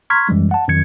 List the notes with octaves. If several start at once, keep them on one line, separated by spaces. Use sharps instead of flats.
A#5 C6 C#6 F6 G#6 B6
F#2 E3 G3 G#3
F#5 A5
F2 D#3 F#3 G#6 C#7